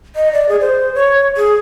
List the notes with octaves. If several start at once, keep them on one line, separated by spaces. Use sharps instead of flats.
D#5
D5
G#4
C5
C#5
G#4